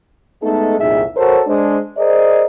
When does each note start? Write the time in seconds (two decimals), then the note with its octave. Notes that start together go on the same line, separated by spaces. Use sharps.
0.43 G#3 A3 B3 D#4 A4
0.79 C2 F2 A#2 D#4 G#4 E5
1.17 F#4 A4 A#4 C5 C#5
1.47 G#3 D4 C5
1.98 G#4 A#4 C5 D5 D#5